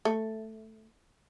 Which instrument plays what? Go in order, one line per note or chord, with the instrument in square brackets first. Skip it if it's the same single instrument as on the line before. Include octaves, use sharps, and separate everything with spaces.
[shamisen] A3